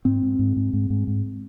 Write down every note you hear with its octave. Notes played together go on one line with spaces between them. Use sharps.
G#2 C4
G#2
G#2
G#2
G#2
G#2
G#2